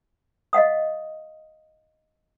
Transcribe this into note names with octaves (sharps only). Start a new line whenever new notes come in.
D#5 F5 F#5 D#6